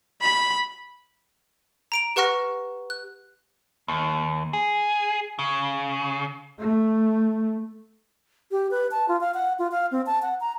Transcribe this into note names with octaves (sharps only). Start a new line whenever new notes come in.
B5
A#5 D7 F7
G4 B4 F#5 C#6 F6 A#6
F#6
D#2
G#4
C#3
A3
G4
B4
A5
F4
F5
F#5
F4
F5
C4
A5
F#5
A#5